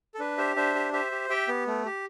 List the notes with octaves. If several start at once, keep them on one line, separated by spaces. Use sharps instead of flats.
A4
D4 B4
G4 C5 E5
D4 C5 E5
G4
G4 C5 E5
G4
G4 E5 G5
B3
A3
G4